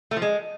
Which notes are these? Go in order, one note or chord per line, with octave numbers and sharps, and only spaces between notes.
A3
F3
G#3